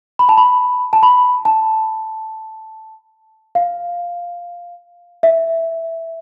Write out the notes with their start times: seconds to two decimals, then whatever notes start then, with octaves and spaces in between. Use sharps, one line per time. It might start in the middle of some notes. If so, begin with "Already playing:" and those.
0.19 B5
0.29 A5
0.38 B5
0.93 A5
1.03 B5
1.45 A5
3.55 F5
5.23 E5